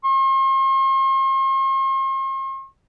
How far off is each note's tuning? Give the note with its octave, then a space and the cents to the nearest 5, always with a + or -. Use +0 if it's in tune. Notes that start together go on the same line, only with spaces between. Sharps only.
C6 +45